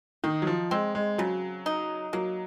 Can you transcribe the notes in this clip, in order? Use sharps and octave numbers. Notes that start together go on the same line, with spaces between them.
D#3 D#4
F#3
F3
G#3 C4
G#3
C#3 F#3
D#4
F#3 A#3